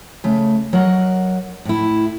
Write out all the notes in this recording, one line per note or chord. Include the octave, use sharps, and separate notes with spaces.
C#3 A3
F#3 A#4 D#5 F#5
A2 E4